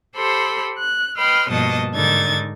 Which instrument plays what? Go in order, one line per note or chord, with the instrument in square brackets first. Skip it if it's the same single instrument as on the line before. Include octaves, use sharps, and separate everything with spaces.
[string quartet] G4 A4 C5 B5 C6
F#6
B4 D#5 G5 B5 C6 F6
G2 B2 F3 A#3 D#5 A5
G#2 D3 D#3 D#4 G#6 A6